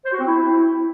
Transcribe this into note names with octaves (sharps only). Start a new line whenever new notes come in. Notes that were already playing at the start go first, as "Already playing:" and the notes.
C5
F#4
C4
E4